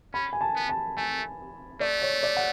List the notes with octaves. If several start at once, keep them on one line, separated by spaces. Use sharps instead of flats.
C#4 B5
G#5
A5
B3
A5
A3 G#5
A3 D5
C#5
D5
F#5